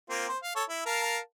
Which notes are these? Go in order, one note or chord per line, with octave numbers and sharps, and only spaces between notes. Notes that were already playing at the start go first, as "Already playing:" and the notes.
A#3 C4 F4
C5
F5
A4 C#5
E4
A#4 F5 A5